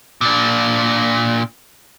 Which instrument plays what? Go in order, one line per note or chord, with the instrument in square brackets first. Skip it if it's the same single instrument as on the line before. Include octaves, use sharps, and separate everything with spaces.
[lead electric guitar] A#2 D4